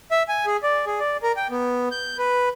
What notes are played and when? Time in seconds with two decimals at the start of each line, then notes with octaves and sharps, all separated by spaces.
0.11 E5
0.29 G#5
0.46 G#4
0.63 D5
0.86 G#4
0.99 D5
1.23 A#4
1.36 G5
1.50 B3
1.91 G6
2.18 B4